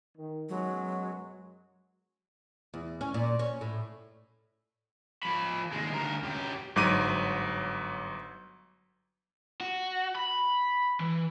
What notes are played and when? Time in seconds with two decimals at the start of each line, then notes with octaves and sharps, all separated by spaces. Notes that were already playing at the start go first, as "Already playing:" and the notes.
0.17 D#3
0.49 F#2 B2 F#3 G#3
2.74 E2
3.01 C#4
3.14 A#2
3.39 C#4
3.61 A2
5.23 F3 B5
5.72 D#2 G#3
5.92 D2 A#4
6.23 F#2 G4
6.76 G1 G#2 F#3 D6 D#7
9.61 F#4
10.16 B5
11.00 E3